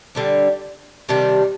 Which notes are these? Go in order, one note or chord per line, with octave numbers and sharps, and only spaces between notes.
D3 G3 D4
C3 D#3 G3 D4